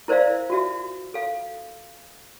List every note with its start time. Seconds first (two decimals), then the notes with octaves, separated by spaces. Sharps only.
0.08 E4 A#4 C5 D5 E5 F5
0.50 F4 F#4 E5
1.14 A4 F5